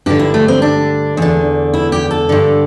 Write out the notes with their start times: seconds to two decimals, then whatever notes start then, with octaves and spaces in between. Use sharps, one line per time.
0.06 G2 D3 G4
0.19 E4
0.34 A3
0.48 C4
0.62 D4
1.17 E2 D3
1.74 E4
1.92 G4
2.11 A4
2.29 G2 D3